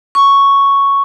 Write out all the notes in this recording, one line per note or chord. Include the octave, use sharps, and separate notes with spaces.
C#6